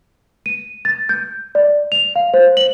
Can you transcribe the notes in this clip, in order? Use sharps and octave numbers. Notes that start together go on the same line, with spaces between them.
D#7
A6
G6
D5
F7
F5
C5
F#7